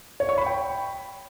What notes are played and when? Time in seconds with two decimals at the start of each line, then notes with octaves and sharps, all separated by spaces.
0.20 C#5
0.29 C#6
0.38 B5
0.46 G5